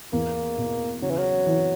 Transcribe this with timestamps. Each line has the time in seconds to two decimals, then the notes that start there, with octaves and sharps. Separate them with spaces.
0.13 E2 A#3
0.58 B2
1.02 C#3 F#3
1.10 E3
1.18 F#3
1.47 E3